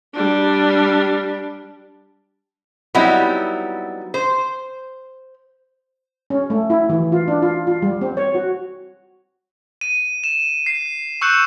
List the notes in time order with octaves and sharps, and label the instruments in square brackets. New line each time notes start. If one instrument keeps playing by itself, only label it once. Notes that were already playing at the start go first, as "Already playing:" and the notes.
[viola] G3 D4
[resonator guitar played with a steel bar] F#3 G3 B3 C4 D#4 E4
C5
[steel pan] C#4
A3
E4
E3
F4
D4
F4
F4
G3
C4
C#5
F#4
[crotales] D#7
E7
C7
C#6 E6 F#6 G6 C#7 E7